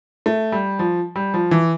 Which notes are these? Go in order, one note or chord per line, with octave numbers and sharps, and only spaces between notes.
A3
G3
F3
G3
F3
E3